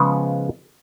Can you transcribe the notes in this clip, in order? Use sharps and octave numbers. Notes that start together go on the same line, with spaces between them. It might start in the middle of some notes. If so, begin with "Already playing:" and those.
Already playing: C#3 F3 G#3 B3